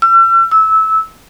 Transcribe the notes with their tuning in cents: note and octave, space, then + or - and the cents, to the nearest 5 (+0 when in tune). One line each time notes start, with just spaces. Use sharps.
E6 +40
E6 -20